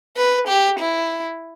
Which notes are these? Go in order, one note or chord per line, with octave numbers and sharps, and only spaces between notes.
B4
G4
E4